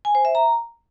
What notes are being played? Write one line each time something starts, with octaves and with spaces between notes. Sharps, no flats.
G#5
C5
E5
A#5